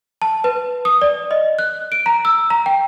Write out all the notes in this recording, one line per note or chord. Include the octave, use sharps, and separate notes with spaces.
A5
B4
D#6
D5
D#5
F#6
D7
A#5
E6
A#5
G5